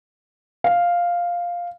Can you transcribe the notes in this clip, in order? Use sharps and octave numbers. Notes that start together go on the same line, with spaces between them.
F5